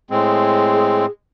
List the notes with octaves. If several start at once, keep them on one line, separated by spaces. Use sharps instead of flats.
A2 G#3 C4 G#4